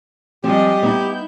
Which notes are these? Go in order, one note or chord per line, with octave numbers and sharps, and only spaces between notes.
F3 G3 G#3 C4 G4 D#5
B3 D#4 E4 G6